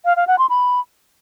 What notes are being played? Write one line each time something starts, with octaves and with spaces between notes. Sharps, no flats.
F5
F5
F#5
C6
B5